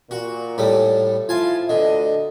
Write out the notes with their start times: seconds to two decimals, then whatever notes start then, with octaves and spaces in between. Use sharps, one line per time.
0.11 A#2 F#4
0.58 A2 G3 A3
1.29 F3 E4 F4 G#5 A5
1.70 D2 D3 D#5